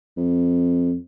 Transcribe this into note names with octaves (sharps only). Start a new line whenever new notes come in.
F2